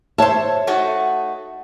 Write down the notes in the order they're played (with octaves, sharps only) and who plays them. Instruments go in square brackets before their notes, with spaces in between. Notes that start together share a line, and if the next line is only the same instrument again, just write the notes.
[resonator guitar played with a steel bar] C5 E5 [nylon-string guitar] C#5 A5
[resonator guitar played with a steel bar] A3 D#4 F#4